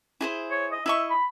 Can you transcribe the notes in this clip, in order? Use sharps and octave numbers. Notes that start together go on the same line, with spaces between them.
E4 G#4 C5
C#5
D#5
E4 D#5 E5 C#6
B5